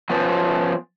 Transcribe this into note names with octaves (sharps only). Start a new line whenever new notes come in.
F3 B3 C#4